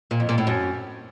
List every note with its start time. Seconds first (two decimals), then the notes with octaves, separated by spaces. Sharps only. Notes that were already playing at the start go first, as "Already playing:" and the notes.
0.11 A#2
0.20 F2
0.29 A#2
0.38 A2
0.47 F#2